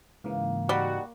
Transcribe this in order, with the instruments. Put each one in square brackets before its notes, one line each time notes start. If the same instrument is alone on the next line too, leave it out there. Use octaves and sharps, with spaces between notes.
[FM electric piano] G#2 C#3 E3 [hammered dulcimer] A#3
[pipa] G3 [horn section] D#4 F#4